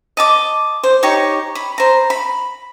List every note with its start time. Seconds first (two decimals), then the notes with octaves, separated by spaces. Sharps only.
0.17 D#5 A5 D6
0.83 C5
1.03 D#4 G4 C#5 C#6
1.55 B5
1.78 C5 A#5
2.10 B5